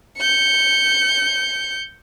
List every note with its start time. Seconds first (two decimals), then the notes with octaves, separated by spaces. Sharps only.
0.18 G6 C#7